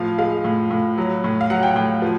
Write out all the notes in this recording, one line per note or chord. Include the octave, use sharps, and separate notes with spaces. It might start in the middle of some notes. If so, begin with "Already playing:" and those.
Already playing: A2 F3 F5
G#3 F5
A2
A2
F#3
A2
F5
F#3 F#5
G5
A2 G5
F3